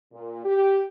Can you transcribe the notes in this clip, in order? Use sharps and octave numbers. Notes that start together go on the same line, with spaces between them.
A#2
G4